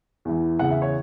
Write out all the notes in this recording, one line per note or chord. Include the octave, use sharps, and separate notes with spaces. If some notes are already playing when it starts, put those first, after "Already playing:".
E2 E3
E2 C#3 E3 F#5
E5
C#5